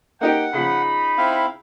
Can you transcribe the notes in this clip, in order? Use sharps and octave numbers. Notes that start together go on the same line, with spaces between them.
A#3 D#4 G4 F#5 G5
C#3 F3 D#4 B5
C4 E4 F5